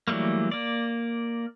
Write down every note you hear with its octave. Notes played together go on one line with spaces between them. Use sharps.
E3 F#3 G3 A3 A#3
A#3 D5